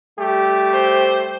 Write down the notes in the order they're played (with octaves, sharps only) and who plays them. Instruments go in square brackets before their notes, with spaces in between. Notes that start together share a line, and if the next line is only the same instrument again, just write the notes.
[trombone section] G3 A3 G4
[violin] C5